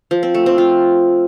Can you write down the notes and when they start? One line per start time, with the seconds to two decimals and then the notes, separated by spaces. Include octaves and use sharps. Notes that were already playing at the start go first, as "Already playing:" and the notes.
0.11 F3
0.23 C4
0.34 A3
0.46 C4
0.58 F4